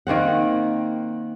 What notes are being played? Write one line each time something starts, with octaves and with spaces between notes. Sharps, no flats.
D#3 A#3 C4 F#5